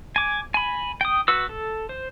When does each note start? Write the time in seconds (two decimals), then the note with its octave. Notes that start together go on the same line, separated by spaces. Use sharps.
0.16 G#5 D6
0.54 G#5 B5
1.01 G5 D#6
1.28 F#4 B4 E6
1.49 A4
1.89 C5